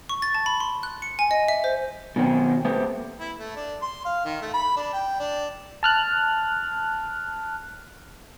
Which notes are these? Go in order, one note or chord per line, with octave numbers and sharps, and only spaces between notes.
C#6
A6
A5
B5
C6
F#6
C#7
G#5
D#5
E5
C5
B2 D#3 F#3 C4 C#4
A3 A#3 G4 B4 C5
E4
A3
D4
C6
F5
D#3
A3
B5
D4
G5
D4
A5 F6 F#6